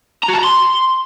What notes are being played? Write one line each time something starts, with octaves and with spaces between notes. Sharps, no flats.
A#5
F#4
A5
A#5
C6